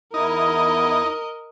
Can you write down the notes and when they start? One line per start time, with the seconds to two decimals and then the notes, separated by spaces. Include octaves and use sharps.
0.14 E2 D#4 E4 A#4 D#5